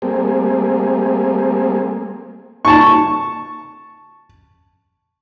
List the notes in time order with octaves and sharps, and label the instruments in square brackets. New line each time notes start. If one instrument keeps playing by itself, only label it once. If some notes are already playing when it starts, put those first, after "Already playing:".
[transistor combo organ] G3 A3 A#3 C4 G#4
[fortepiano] A5 C#6